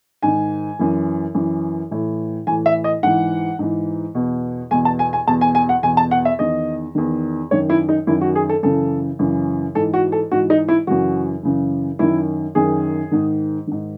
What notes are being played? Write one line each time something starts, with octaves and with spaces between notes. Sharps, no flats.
G#2 D#3 G#5
F#2 E3
F#2 E3
A2 E3
A2 E3 G#5
E5
D#5
G#2 E3 F#5
G#2 E3
E2 B2
E2 B2 G#5
A5
G#5
G#5
E2 B2 A5
G#5
G#5
F#5
E2 B2 G#5
A5
F#5
E5
E2 D#3 D#5
E2 D#3
F#2 D#3 C#5
E4
D#4
F#2 D#3 E4
F#4
G#4
A4
F#2 C#3 E3 A4
F#2 C#3 E3
G#2 E3 A4
F#4
A4
G#2 E3 F#4
D#4
E4
F#2 C#3 E3 F#4
F#2 C#3 E3
F#2 D#3 E4
F#2 D#3 G#4
G#2 D#3
G#2 D#3